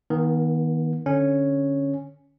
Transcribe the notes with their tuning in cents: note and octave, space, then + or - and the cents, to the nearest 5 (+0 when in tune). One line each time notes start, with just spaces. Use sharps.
D#3 +25 B3 -35
D3 +0 C#4 +0